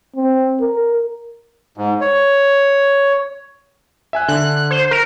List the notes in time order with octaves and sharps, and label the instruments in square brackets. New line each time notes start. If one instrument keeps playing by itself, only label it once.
[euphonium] C4
A#4
[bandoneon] G#2
C#5
[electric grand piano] E5 G#5 F#6
[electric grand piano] D3 [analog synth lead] F#6
[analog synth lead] C5
A#4